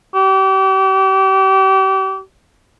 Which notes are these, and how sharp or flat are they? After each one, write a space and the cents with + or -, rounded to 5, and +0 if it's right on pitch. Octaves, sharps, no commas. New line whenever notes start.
G4 -35